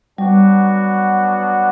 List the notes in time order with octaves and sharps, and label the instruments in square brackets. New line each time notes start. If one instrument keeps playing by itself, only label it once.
[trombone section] F#3 B3 D4 F#4 [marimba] G3